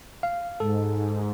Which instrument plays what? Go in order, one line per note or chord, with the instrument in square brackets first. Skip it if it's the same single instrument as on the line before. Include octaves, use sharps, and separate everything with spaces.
[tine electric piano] F5
[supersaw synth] G#2 [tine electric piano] A4